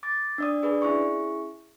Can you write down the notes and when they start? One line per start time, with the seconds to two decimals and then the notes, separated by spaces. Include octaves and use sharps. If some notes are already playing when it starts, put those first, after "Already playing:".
0.03 D6 A6
0.38 D4 D5 D#6
0.63 D4 G#4 B4 D5
0.82 C#4 E4 G#4 C#6